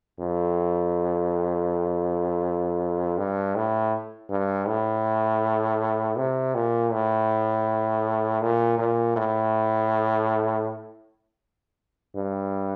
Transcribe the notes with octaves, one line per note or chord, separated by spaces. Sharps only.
F2
G2
A2
G2
A2
C3
A#2
A2
A#2
A#2
A2
G2